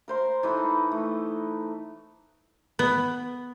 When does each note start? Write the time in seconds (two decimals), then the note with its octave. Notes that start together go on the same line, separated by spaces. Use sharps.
0.08 A#4 C5 C6
0.43 E3 D#4 A4 B4
0.91 A3
2.79 B3